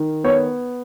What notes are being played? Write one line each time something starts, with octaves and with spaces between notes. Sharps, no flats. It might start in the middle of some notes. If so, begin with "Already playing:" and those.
Already playing: D#3
B3 C#5